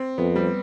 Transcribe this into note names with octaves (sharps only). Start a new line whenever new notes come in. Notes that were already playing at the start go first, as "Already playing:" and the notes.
Already playing: C4
F2 B3
G3